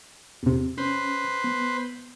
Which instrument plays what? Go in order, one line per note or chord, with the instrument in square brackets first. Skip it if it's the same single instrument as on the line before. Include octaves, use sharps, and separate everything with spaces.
[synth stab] E2 C3
[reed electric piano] C#4 [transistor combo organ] B4 C5
[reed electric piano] B3